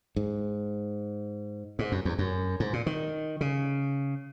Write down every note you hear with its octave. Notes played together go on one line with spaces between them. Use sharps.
G#2
G#2
F#2
E2
F#2
G#2
A#2
D#3
C#3